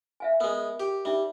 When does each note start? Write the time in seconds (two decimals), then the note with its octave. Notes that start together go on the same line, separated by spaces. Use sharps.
0.20 E5 F5 G#5
0.40 G#3 B3 A#4
0.80 G4
1.05 G3 D#4 E5